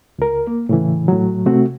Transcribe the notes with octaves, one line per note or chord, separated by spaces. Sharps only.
C#2 A#4
A#3
A2 C#3 E3
A2 F#3
C3 A3 C4 F#4